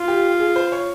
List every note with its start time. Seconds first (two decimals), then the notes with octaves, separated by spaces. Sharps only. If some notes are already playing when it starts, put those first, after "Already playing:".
Already playing: F4
0.08 G4
0.40 G#4
0.56 C5
0.72 C#5